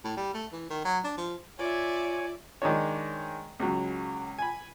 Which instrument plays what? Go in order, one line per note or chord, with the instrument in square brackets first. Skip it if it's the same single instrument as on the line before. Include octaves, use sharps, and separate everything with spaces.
[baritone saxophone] A2
G3
A3
E3
D#3
F#3
D4
F3
[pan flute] F4 [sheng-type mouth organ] C#5 G#5 [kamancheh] D5 E5
[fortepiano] D#3 G#3 D4 C#5
C#2 F#3
G#5 B5